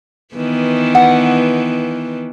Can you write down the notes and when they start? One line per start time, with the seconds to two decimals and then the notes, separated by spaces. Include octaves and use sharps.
0.35 D#3 E3 B3
0.95 F#5